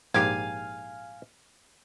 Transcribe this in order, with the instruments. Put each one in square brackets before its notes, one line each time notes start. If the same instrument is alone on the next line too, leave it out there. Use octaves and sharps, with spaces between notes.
[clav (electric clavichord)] A#1 G#2 G4 [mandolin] F5 G#5